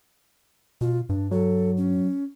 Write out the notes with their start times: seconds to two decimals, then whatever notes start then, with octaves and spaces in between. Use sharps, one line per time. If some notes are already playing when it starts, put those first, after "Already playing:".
0.81 B2 F4
1.09 G2 D4
1.31 F#3 A4
1.77 C#4